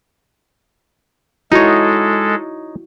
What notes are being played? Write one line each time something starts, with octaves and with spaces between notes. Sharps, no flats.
G#3 D#4 E4 F#4 A4 C#5